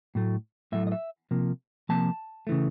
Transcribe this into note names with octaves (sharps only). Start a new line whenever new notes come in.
A2 F#3 A3
A2 F#3 A3 E5
D#5
E5
C3 F3 A#3
C3 F3 A#3 A5
C#3 E3 A3